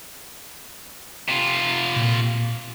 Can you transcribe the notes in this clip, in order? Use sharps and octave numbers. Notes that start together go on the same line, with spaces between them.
C3 F4
A#2